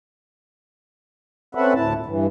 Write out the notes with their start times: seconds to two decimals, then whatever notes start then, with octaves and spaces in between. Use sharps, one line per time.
1.55 C4 C#4 A4 B4 E5 F#5
1.75 D2 A2 E4 A5
1.94 A#2
2.06 G2 E3